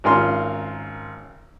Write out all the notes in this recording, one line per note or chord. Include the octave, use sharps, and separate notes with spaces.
G#1 C#4 F4 A#4 C6 F6